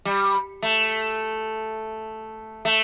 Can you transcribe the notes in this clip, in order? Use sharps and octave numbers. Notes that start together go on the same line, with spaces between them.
G3
A3
A3